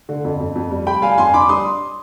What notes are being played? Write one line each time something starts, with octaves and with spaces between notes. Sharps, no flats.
D3
F2
F2
F2
G3
G3 G5 B5
G3 F5 G#5
F2 G#5 C6
D4 B5 D6
G3 C6 D#6